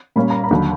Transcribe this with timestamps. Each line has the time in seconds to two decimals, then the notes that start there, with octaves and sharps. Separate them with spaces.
0.16 A#2 G3 A#3 C#4 B5
0.30 A#5
0.44 B5
0.51 D#2 D3 F#3